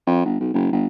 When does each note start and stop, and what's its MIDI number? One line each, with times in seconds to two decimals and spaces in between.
0.07 0.20 41
0.25 0.39 31
0.40 0.52 35
0.54 0.68 30
0.73 0.87 31